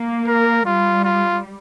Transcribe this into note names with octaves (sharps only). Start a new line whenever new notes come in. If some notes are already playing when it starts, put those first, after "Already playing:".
Already playing: A#3
A#4
G3 F4
F4